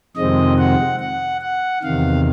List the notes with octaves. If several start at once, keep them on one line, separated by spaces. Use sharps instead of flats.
F2 C3 D#3 G#3 C4 D#5
F#5
F#5
F#5
E2 C3 D#3 F5